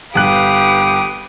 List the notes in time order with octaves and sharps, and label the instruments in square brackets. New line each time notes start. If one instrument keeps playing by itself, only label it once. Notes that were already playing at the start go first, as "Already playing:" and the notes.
[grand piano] G1 F#6 [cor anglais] G4 [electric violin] B4 D7 [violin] F5 D#6